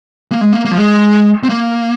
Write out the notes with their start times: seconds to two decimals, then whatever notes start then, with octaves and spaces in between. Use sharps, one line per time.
0.32 A#3
0.41 G#3
0.52 A#3
0.65 A#3
0.71 F3
0.77 G#3
1.43 C4
1.49 A#3